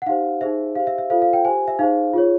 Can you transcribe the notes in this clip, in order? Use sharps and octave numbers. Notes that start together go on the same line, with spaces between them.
F#5
D#4 G4 C5 F5
D#4 G#4 C5 E5
G4 C5 F5
E5
E5
F4 A4 C5 F5
F5
G5
G4 C5 G#5
E5
D#4 G#4 C5 F5
F4 G#4 C#5